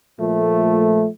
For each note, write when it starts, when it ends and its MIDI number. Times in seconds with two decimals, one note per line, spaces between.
0.20 1.07 46
0.20 1.07 53
0.20 1.07 57